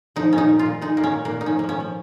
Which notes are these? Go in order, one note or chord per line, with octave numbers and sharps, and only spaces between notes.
F3 D#4
A#2 C#4
D#4
A#2
F4
A#2
G#3 D#4
A#2 A#3
C#4
A#2
A#3
A#2
D#4
F3 C#4
F3 A#3
C#4
F3